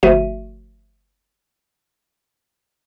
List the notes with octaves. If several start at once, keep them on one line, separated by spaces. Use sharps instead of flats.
G1 F3 A3 F#4 E5 D#7